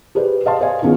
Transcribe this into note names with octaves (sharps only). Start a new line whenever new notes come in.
G4 G#4 B4 C5 D5
D#5 F5 A5 C6
C5 D5 D#5 F5 G#5
D#3 B3 C#4 F4 G#4